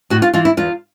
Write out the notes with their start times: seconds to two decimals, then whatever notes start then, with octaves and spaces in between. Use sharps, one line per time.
0.10 A2 F#4
0.22 F4
0.34 E3 F4
0.45 E4
0.57 E2 F4